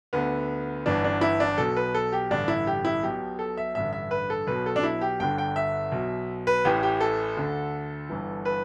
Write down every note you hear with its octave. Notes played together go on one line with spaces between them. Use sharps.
D2 D3 B3
G1 G2 E3 D4
D4
E4
D4
B1 B2 A4
B4
A4
G4
A1 G2 D3 D4
E4
G4
E4
B1 B2 G4
A4
E5
A1 G2 D3 E5
E5
B4
A4
B1 B2 B4
A4
D4
E4
G4
G1 G2 D3 G5
G5
E5
B1 B2
B4
A1 A2 E3 G4
G4
A4
D2 D3
G1 G2 E3
B4